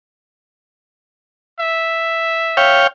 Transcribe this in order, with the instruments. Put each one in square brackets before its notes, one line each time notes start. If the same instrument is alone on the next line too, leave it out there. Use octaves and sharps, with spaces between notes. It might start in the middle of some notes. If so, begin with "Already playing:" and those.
[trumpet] E5
[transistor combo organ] C#5 F5 G5